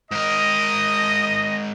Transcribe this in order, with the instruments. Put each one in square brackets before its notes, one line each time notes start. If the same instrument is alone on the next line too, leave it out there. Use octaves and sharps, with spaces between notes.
[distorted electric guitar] G#2 A#4 [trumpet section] D#5